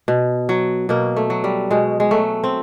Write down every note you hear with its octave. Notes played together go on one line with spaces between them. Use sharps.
B2
F#3
B2 A#3
A3
F#3
G3
B2 G#3
G#3
F#3 A3
C4